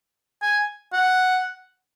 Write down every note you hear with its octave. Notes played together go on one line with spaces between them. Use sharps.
G#5
F#5